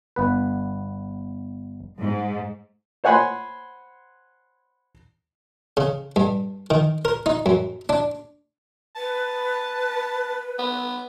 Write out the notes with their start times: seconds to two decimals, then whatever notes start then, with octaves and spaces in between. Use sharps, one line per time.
0.16 G1 B3 B4
2.00 G#2
3.04 C5 C#5 F#5 G#5 B5 C6
5.77 C#3
6.16 G2
6.70 D#3
7.05 A#4
7.26 D#4
7.46 F#2
7.89 D4
8.96 B4 A5
10.59 B3